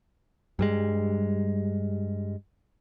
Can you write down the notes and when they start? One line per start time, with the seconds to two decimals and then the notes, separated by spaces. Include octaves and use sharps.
0.59 G2 G3 G#3